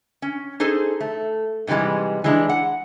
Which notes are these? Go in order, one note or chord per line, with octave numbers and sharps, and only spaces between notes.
C#4
D#4 G#4 A4 C5
A3
G#2 C3 E3 G3 G#3
E3 G#3 D4
F#5